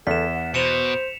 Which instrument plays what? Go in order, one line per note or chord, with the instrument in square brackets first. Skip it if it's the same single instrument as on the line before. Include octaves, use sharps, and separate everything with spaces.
[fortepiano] E2 [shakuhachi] A4 [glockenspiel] B6 E7
[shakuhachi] F#5
[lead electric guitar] B2 [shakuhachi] C5 [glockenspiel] C#7 E7 F7